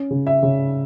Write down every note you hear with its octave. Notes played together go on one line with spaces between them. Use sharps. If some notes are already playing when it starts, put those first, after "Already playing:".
Already playing: C#4
C#3
E5
C#3